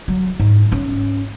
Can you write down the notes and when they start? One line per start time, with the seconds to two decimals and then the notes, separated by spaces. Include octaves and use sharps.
0.08 F#3
0.40 G#2
0.72 C#4